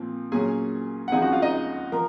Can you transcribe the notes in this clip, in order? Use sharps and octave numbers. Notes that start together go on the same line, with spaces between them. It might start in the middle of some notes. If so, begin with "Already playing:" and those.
Already playing: A#2 F3 C4
A#2 F#3 C#4 G#4 G#5
F#5
C#2 C#3 F3 C4 D#4 G#4 G#5
F#4 F#5
F4 F5
D#4 D#5
F3 A#4 A#5